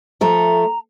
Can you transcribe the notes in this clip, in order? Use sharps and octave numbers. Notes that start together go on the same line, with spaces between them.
F3 A3 A#5